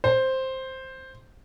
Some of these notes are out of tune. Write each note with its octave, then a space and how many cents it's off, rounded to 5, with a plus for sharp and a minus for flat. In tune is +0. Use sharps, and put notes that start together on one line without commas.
C5 +5